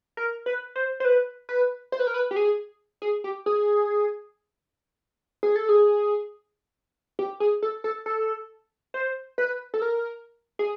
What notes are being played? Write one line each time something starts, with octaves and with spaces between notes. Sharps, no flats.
A#4
B4
C5
C5
B4
B4
C5
B4
A#4
B4
G4
G#4
G#4
G4
G#4
G#4
A4
G#4
G4
G#4
A4
A4
A4
C5
B4
A4
A#4
G#4